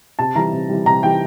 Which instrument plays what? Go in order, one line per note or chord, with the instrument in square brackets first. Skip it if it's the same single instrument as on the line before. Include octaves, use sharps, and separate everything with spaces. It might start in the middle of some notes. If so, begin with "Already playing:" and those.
[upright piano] C3 A5
E3 G3 A#5
C3
E3 G3
C3 A#5
E3 G3 G5